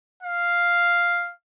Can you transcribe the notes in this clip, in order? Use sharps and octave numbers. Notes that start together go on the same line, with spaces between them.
F5